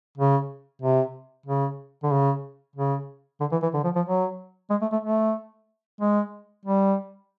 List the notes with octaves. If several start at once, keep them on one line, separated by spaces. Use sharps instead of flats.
C#3
C3
C#3
D3
C#3
C#3
D3
E3
E3
D3
F3
F3
F#3
G#3
A3
A3
A3
G#3
G3